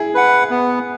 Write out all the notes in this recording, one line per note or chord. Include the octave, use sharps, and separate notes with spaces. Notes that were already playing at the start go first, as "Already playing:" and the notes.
Already playing: E4 G#4
B4 F#5
B3